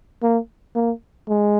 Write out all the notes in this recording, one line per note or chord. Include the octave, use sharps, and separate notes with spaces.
A#3
A#3
G#3